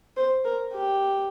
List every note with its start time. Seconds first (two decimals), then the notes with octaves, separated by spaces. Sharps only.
0.16 C5
0.45 A#4
0.73 G4